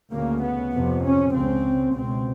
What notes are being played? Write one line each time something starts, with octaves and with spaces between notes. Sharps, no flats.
D2 C#3 A#3
B3
F2 C3
C#4
C#2 C#3 C4
C#2 B2 C4